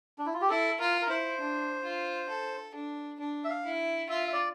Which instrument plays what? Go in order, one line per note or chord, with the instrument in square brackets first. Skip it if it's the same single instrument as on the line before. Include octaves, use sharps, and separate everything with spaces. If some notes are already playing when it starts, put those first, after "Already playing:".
[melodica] D4
E4
F4
G4
[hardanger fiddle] E4 [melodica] A4
[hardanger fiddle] F4 [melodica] A#4
[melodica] A#4
[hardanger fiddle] E4 [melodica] C5
[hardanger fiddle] D4
F4
A4
D4
D4
[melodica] E5
F5
[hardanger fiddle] E4
[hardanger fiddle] F4 [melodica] E5
[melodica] E5
D5